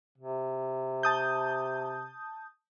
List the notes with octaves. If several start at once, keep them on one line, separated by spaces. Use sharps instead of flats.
C3
A5 D#6 G6